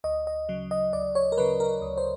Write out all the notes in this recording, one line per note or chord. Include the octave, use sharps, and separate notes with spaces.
D2 D#5
D#5
C#3 F#3
D#5
D2 D5
C#5
A#4
C#3 F#3 B4
A#4
D2
C5